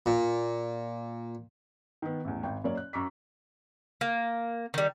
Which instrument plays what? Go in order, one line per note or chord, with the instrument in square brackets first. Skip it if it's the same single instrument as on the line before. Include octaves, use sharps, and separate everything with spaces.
[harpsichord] A#2
[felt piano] D#3 B3
A1 E2
G#1 G5
F#1 F#3 A#3 C#5 D5
F#6
F#2 A#5 C#6 D6 B6
[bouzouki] A#3
D#3 G3